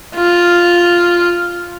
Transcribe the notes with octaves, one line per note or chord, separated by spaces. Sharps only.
F4